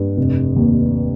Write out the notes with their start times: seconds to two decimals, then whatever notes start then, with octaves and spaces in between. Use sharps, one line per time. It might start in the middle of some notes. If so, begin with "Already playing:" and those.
Already playing: G2
0.17 F1
0.56 D#2